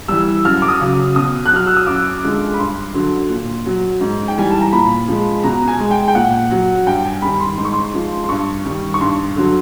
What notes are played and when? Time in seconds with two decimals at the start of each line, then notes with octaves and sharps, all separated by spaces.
0.08 E3 G3 E6
0.45 F#2 F6
0.62 D6
0.69 D#6
0.81 C#3 F#3
1.16 B2 D#6
1.46 F#6
1.52 F#3 F6
1.67 E6
1.77 D#6
1.87 F#2 D6
2.23 D3 F3 G#3
2.54 B5
2.59 G2 C6
2.94 D3 F#3
3.29 A#2
3.66 F#3
4.01 G#2
4.28 G5
4.37 E3 G3 G#5
4.50 A5
4.61 A#5
4.72 A#2 B5
5.08 F3 G#3
5.43 B2 A#5
5.68 G#5
5.80 G#3
5.91 G5
6.08 G5
6.15 A#2 F#5
6.51 F#3
6.86 G2 G5
7.04 G#5
7.22 D#3 G3 B5
7.40 C6
7.57 G#2 C6
7.65 C#6
7.73 C6
7.93 F3 G#3
8.24 C6
8.29 G2 C#6
8.65 D#3 G3
8.94 C#6
9.00 G2 C6
9.36 D3 F#3